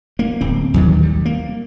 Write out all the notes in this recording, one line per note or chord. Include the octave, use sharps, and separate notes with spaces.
A#3
D1 C4
D#2 D#3 F#3
G3
A#3